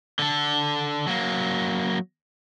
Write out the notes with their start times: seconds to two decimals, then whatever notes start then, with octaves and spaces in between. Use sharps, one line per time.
0.19 D3 A4
1.07 F#3 A#3